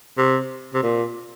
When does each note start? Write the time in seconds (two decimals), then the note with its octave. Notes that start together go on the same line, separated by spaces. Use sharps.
0.18 C3
0.74 C3
0.83 A#2